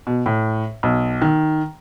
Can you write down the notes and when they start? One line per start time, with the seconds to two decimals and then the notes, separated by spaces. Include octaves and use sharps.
0.07 B2
0.26 A2
0.83 B1
1.22 D#3